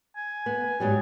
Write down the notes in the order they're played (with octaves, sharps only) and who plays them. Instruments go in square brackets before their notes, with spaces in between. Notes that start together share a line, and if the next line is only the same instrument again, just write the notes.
[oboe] G#5
[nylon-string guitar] B3
G#2 F#3 G3